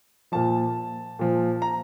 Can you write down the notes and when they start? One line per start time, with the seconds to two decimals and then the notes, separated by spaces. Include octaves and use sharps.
0.32 A#2 F3 A5
1.19 A#2 F3
1.62 A#5